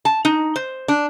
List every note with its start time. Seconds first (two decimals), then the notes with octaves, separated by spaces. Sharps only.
0.05 A5
0.25 D#4
0.56 C5
0.88 D4